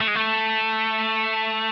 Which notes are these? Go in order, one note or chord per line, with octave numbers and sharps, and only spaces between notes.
A3
G#3
A3